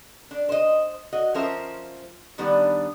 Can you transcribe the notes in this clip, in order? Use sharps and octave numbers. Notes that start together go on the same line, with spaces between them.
D4
C5 D#5
F#4 D#5
F3 C#4 F4 A#4 C5 E5
D#3 G3 B3 D4